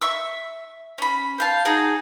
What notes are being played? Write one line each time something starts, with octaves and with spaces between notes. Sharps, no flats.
E5 C#6 E6
C#4 B5
C5 F5 A5
D#4 F#4 G#4 A5